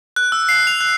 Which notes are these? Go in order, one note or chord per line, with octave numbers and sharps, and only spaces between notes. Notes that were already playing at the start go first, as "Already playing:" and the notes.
F#6
E6
C7
F7
F#6